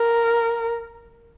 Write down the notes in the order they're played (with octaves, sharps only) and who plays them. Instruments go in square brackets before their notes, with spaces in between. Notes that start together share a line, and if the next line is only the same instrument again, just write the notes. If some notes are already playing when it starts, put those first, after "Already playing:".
Already playing: [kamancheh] A#4